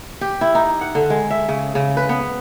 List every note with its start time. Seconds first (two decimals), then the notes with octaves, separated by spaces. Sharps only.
0.21 G4
0.41 E4
0.55 D#4
0.81 F#5
0.95 D3
1.10 G#3
1.30 E5
1.48 C#3
1.75 C#3
1.97 B4
2.09 B3